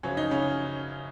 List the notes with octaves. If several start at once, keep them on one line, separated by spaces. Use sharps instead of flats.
F#2 C#3 F3 C#4
D#4
C#3 C#4